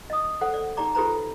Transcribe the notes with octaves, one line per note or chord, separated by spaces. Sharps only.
D#5 D#6
A4 C5 F#5
D5
D#4 G4 D5 A#5 D6
F4 G4 A4 B4 C5 A#5